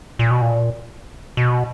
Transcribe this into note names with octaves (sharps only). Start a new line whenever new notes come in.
A#2
B2
A#2
B2